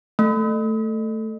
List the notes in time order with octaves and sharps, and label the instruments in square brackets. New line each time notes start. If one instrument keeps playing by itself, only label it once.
[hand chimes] A3